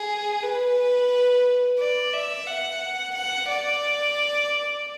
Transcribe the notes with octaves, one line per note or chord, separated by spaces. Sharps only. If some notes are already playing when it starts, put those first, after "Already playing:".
Already playing: G#4
B4
D5
E5
F#5
F#5
D5